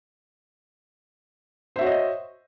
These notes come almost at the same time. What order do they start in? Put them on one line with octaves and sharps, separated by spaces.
C5 E5 F#4 C#5 D#5